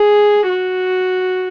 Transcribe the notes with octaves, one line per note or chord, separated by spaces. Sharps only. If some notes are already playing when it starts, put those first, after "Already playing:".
Already playing: G#4
F#4